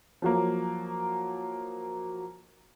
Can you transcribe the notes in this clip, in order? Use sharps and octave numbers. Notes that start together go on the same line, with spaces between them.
F3 F#3 A#3